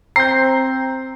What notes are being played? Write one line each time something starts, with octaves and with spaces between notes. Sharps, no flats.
C4 A#5 G6 C7